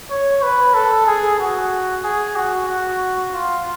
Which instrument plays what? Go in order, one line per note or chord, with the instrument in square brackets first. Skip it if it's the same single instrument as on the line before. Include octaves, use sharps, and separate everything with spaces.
[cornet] C#5
B4
A4
G#4
F#4
G#4
F#4
F#4
F4